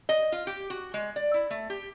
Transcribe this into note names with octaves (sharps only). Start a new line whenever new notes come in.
D#5
F4
G4
F#4
G#3
D5
E4
A3
G4